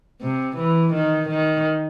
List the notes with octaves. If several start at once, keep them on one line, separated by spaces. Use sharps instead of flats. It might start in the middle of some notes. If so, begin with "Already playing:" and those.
C3
E3
D#3
D#3